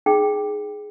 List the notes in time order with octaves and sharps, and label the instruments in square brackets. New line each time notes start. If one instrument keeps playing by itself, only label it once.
[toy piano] D#4 G#4 G5